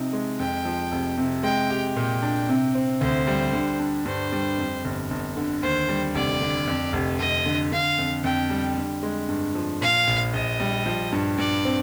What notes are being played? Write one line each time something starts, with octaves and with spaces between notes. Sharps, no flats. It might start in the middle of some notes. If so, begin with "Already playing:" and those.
Already playing: C3 F3 D#4
G#3
F2 G5
F3
F1
C3
G#3 G5
G4
A#2 G5
D4
C3
C4
D2 C5
G3
D3
D4
G2 C5
G3
F2
G1
G1
D3
D#2 C5
G3
F1 D5
D3
F2
F1
F1 D#5
D3
D3 F5
F2
F2 G5
G3
D3
G#3
G2
F3
A#2 F5
A#1
A#1 D#5
G3
F3
G2
G2 D5
C4